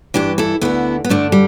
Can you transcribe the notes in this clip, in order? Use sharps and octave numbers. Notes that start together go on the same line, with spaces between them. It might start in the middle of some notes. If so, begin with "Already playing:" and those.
G2 E3 D4 G4
E4 A4
D2 D3 B3 E4
B3
G2 D3 A3 D4
G3